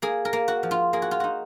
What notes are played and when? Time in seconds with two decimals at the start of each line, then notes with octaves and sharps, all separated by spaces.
0.02 A#3 G#4
0.25 A#4
0.33 A#3
0.48 F#4
0.63 F3
0.71 F4
0.93 A#3 G#4
1.02 F#4
1.11 F4
1.20 D#4 F#4